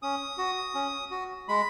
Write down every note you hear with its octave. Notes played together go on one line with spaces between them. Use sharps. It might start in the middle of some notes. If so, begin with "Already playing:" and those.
C#4 D#6
F#4
C#4
F#4
G#3 B5